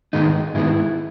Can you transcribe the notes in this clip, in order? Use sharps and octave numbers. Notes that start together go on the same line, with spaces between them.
G#2 D#3 G#3 B3 D#4
G#2 D#3 G#3 B3 E4